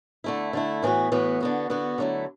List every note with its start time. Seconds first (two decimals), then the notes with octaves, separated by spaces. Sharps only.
0.24 D3 A3 E4
0.53 D3 A3 E4
0.83 A2 E3 B3 F#4
1.12 A2 E3 B3 F#4
1.40 D3 B3 F#4
1.70 D3 B3 F#4
1.98 D3 F#3 A3 E4